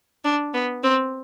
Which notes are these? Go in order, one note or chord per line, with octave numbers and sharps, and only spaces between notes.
D4
B3
C4